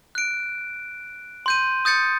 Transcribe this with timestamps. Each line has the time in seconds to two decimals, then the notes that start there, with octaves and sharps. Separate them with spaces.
0.15 F#6 D7
1.46 C6 G6 D#7
1.85 D#6 G6 A6 C#7